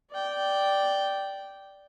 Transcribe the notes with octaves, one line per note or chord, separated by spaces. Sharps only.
D5 G5